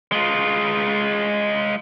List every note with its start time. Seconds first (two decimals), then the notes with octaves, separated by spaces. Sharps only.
0.12 G#3 F4